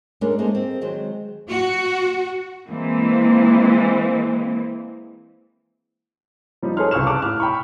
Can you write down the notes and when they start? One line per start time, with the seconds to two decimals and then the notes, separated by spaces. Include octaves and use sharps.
0.21 G#3 A3 C#4 D4 A#4 D5
0.38 A#3 D#4 G#4 A4 C5
0.53 G3 C4
0.81 D#3 F#3 G#3 C5
1.50 F#4
2.68 E3 G#3 A#3 C4
6.62 F3 G3 C4 D#4
6.77 G#4 A4 B4 C#5 C6 F6
6.91 C2 C#3 C#6 E6 F6 E7
7.07 A5 D6 F6 F#6
7.22 A2 F6
7.40 G5 B5 C#6